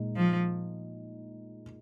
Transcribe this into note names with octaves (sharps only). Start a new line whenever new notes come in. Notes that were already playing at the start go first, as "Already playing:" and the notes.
Already playing: A#2 G#3 D#4
F3